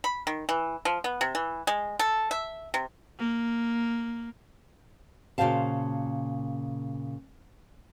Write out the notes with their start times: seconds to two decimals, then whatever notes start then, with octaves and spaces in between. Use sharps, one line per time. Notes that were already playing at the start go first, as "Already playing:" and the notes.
0.04 B5
0.27 D#3
0.49 E3
0.85 F3
1.04 B3
1.21 C3
1.35 E3
1.67 G#3
1.99 A4
2.31 E5
2.74 C3
3.18 A#3
5.38 A#2 C#3 F#4 C5 F5 A5